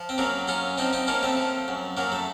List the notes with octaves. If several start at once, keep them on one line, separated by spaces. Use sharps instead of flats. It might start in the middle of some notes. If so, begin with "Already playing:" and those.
Already playing: F3
C4
F#2 F#3 A#3
F#2 C#4 F4
F3 C4 D#4
C4 D#4
F3 A#3 C#4
A3 C4
F3
F#2
F#2 F#3 A#3
A3